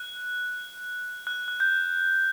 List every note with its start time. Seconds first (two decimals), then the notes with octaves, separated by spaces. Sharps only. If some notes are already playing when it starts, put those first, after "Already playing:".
Already playing: F#6
1.27 F#6
1.48 F#6
1.60 G6